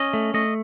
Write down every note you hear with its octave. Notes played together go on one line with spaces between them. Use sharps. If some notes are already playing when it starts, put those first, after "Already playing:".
Already playing: C#4 D#5
A3
A3 D#5